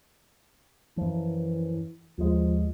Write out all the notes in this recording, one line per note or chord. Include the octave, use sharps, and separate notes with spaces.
F#2 E3 F3
D#2 F3 G#3